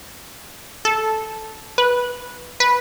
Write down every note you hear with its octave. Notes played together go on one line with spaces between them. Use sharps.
A4
B4
B4